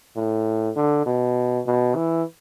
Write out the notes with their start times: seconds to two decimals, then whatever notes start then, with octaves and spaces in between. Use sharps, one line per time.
0.16 A2
0.76 D3
1.06 B2
1.66 B2
1.96 E3